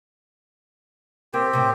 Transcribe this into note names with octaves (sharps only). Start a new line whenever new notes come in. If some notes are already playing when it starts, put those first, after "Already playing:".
A#3 C4 G4
A2 C3